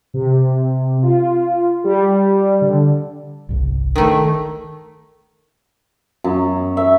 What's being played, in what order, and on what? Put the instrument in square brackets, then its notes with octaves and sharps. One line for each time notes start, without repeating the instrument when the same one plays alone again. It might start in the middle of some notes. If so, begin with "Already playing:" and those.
[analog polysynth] C3
F4
G3
D3
[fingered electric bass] G1 C2
[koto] D#3 A3
[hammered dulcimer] F#2
E5